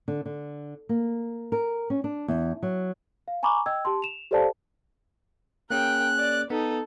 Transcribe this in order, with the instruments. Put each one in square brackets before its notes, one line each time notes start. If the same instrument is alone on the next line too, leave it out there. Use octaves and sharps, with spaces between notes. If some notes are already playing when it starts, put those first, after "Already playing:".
[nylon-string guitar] D3
D3
A#3
A#4
C#4
D4
E2
F#3
[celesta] F5
G#5 A#5 B5 C#6 D6
D#5 G5 E6 G#6
G4 A5 C6
E7 F7
G4 A4 C5 D5 F5 A5
[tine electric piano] A#3 C#4 G#4 [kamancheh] A#4 G5 [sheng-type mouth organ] F#6
[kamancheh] D5
[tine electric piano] B3 [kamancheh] D#4 A4